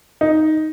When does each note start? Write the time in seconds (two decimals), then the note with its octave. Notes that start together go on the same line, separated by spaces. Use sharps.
0.21 D#4